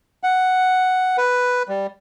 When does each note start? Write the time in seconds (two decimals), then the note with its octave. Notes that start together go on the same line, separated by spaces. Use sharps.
0.23 F#5
1.18 B4
1.68 G3